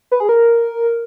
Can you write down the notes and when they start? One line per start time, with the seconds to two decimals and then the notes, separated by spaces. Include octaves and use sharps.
0.12 B4
0.20 G#4
0.29 A#4